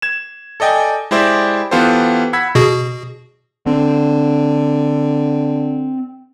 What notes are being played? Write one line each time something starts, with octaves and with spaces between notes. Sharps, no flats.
G#6 E7
A4 D5 D#5 G5 G#5
G#3 E4 G4 C5 D5 E5
E3 B3 F4 G4 A4 C5
F#5 B5 E6 G#6 B6
B2 F#4 G#4
D3 C4